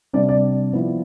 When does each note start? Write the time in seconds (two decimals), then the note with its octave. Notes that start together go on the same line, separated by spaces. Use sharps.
0.13 C3 G3 D4 D5
0.29 D5
0.73 F3 B3 E4